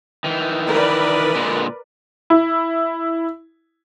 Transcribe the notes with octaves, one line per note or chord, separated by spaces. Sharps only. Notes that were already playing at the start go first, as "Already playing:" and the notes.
D#3 E3
A#4 B4 D5
A#2 D3 G#3
E4